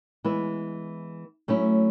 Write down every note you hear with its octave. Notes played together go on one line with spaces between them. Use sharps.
E3 G#3 B3 E4
F#3 A3 C#4 E4